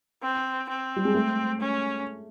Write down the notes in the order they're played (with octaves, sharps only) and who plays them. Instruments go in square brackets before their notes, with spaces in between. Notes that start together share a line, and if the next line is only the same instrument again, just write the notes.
[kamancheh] C4
C4
[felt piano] G3
G#3
A3
[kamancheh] C#4